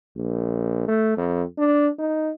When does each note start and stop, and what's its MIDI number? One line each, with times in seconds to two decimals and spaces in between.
0.16 0.87 34
0.88 1.16 57
1.17 1.44 41
1.58 1.88 62
1.99 2.31 63